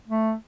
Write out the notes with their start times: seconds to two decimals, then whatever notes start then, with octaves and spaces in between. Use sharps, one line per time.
0.08 A3